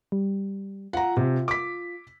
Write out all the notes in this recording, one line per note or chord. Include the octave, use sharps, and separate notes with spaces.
G3
F4 F#5 A#5
C3
D6 B6